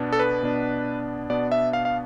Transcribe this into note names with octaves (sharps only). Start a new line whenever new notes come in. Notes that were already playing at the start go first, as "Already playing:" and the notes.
Already playing: B2 B3 D4
A4
B4
B2 B3 D4
B2 B3 D4 D5
E5
F5
F5